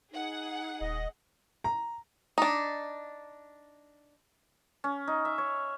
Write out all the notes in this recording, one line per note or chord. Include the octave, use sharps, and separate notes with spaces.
D#4 G#4 F#5
D#1 D#5
A#5
D4 D#4
C#4
D#4
E5
C#5